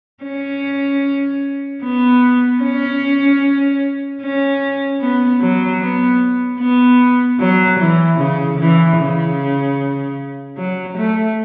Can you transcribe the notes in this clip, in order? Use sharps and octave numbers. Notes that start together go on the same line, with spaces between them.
C#4
B3
C#4
C#4
B3
F#3
B3
B3
F#3
E3
C#3
E3
C#3
F#3
A3